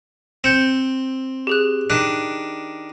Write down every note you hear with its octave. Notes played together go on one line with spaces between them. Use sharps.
C4 G6 C#7 E7
G4 G#4 F#6
D#3 D4 F#6